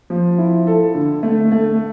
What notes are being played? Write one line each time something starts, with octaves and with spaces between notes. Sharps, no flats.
F3
E4
A4
D3
A3
A3